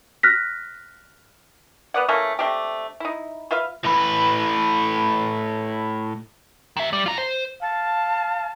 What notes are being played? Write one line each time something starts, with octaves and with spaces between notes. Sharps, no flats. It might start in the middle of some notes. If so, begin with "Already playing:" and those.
F6 F#6 A#6 B6
B3 B4 D5 F#5
E3 A3 A#3 C#4
A3 C4 D4 G4
D#4 E4
F4 B4 E5 F5
A2 B4
D#3 E5
G3
F4 A#5
C5
F5 A5